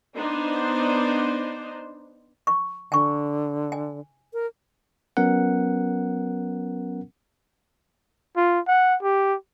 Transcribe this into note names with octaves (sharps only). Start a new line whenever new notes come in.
B3 D4 D#4 C5
C#6
D3 G#5 C#6
G#5
A#4
F#3 B3 C#4 A#4 F#5
F4
F#5
G4